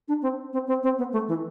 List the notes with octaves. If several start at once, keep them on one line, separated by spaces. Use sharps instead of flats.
D4
C4
C4
C4
C4
B3
A3
E3